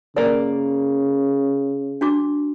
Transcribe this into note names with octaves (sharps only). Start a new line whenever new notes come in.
C#3 A#3 D5
D4 F#4 D6